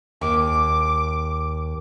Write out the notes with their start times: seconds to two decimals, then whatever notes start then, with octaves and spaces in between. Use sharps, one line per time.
0.21 D#2 D6